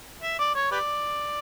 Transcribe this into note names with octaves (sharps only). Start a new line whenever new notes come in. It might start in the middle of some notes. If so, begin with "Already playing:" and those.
E5
D5
C#5
G4 B4 D5